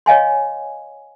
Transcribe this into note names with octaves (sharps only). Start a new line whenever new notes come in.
C#5 D#5 F5 G#5 C6